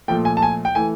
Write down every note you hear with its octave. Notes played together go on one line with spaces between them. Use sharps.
A#2 F3 A3 G5
G#5
A5
G#5
G5
E3 A3 G#5